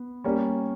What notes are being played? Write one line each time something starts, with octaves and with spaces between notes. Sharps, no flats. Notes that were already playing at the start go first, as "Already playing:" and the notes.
Already playing: B3
G3 A#3 C#4